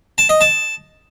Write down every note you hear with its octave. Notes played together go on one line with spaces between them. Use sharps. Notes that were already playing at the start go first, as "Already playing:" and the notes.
A5
D#5
A5